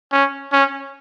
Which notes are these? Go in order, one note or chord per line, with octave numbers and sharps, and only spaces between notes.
C#4
C#4